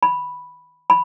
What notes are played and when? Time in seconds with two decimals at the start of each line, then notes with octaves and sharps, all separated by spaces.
0.03 B5
0.90 B5